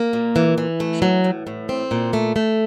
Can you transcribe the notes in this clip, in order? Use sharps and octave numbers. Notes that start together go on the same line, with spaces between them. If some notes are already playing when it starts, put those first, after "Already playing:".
Already playing: A#3
A#2
E3
E3
A3
F#3
A2
A2
C4
A#2
A3
A3